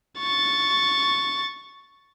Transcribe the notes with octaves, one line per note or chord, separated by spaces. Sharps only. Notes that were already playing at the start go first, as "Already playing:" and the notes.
C#6 A6